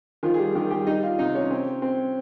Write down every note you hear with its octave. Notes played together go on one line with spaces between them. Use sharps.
D#3 F3 F4
G#4
G3 G4
D#3 G3 G4
G3 G4
G3 D#4 D#5
F4 F5
C3 D#4 D#5
C#4 C#5
C4
C4